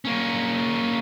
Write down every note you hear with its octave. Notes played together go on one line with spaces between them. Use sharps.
A#3 C#4